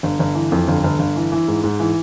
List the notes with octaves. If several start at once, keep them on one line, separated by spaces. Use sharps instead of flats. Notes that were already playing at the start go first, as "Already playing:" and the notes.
G1
G1
E3
F2
G1
G1
G1
E3
E3
G#2
G#2
E3